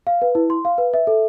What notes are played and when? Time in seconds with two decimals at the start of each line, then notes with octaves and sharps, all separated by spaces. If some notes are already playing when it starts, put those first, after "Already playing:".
0.07 F5
0.22 B4
0.35 E4
0.50 C6
0.65 F5
0.78 B4
0.94 E5
1.07 A4